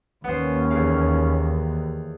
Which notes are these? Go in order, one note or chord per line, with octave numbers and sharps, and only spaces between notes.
D#2 B3 C#4 C5
E2 F5